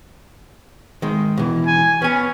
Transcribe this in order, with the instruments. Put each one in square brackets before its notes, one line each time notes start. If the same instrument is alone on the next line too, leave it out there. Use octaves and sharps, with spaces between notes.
[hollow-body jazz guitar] D#3 G#3
B2 E3
[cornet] G#5
[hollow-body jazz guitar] B3 G#5 [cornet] C#4